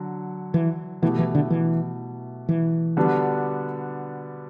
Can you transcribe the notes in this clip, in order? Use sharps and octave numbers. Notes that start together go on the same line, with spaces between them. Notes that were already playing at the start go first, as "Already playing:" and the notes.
Already playing: D3 F#3
E3
B2 E3 A3 E4 G4
E3
D3
E3
E3
D3 G3 B3 D4 F#4